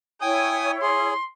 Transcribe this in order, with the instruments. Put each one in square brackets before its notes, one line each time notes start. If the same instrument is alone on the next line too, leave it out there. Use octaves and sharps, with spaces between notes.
[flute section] E4 C#5 [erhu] G5 [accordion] G#5 D#6
[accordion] G#4 [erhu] C6